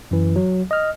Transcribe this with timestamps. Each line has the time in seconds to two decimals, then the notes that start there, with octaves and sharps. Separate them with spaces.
0.11 F#2 E3
0.36 F#3
0.71 D#5 F6